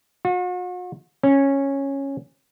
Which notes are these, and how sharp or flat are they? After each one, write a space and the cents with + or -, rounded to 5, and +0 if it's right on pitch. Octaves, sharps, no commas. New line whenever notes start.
F#4 -45
C#4 -10